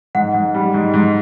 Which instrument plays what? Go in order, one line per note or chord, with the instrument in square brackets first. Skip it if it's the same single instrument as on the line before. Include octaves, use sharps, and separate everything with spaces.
[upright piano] G#2 [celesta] F#5
[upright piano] G#2
G3
G#2
G#2